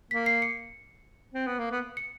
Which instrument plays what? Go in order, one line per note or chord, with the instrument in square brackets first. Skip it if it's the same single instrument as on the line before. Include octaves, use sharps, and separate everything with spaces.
[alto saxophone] A#3 [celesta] B6
[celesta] C7
C#7
[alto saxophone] C4
B3
A#3
B3
[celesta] C#7